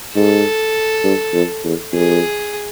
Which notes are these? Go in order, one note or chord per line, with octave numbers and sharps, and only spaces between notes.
G#2 A4
G2
F2
E2
F2 G#4